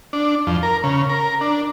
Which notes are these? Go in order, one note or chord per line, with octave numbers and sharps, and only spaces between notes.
D4
F2
A#4
C#3
A#4
D4